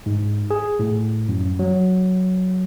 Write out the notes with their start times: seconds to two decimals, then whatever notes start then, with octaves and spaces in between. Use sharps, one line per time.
0.06 G#2
0.51 G#4
0.79 A2
1.29 F#2
1.59 F#3